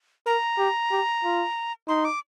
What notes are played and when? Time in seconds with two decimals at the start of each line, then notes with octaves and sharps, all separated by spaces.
0.26 A#4 A#5
0.58 G4
0.91 G4
1.24 F4
1.88 D#4 C6
2.05 D6